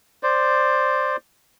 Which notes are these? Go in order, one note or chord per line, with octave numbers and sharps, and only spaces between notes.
C5 D5